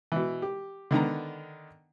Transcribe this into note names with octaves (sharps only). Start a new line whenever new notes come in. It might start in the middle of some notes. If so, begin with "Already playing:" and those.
B2 E3
G4
D3 D#3 B3 A#5